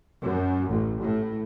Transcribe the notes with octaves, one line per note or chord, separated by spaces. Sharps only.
F#2
A1
A2